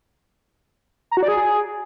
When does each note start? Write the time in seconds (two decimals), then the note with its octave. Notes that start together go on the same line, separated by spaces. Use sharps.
1.11 A#5
1.17 F#4
1.23 D5
1.28 G#4